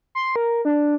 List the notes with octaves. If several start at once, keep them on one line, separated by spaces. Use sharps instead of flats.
C6
A#4
D4